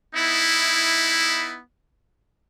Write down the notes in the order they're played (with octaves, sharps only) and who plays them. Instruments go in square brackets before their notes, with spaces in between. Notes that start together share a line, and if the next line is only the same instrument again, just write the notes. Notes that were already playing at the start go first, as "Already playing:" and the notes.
[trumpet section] B3 D#4 E4